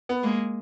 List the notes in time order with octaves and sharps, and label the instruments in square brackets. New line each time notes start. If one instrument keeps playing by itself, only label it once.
[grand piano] B3
[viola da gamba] G#3 A#3